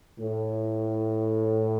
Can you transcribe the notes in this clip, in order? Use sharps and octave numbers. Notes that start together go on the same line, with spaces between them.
A2